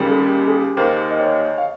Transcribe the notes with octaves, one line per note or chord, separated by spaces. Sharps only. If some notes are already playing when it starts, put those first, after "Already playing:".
Already playing: D#2 C#3 G3 A#3
G#4
G4
G#4
D#2 D#3 A#3 C5
D#5
C#5
F5